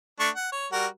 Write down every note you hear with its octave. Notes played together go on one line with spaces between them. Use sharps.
A3 D4 C#6
F#5
C#5
G3 F#4 A#4